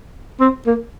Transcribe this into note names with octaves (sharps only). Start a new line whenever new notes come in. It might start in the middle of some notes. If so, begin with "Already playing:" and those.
C4
A#3